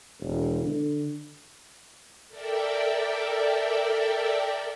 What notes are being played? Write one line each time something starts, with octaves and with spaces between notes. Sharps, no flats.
E1
D3
A4 A#4 D5 E5 G5